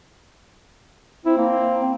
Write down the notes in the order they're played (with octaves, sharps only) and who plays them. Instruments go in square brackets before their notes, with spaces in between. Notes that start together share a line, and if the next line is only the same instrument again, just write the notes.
[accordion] C4 [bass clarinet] E4
[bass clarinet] A#3
C4